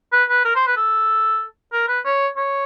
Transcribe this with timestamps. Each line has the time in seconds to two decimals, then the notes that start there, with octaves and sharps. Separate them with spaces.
0.12 B4
0.29 B4
0.44 A#4
0.55 C5
0.67 B4
0.76 A4
1.72 A#4
1.88 B4
2.05 C#5
2.36 C#5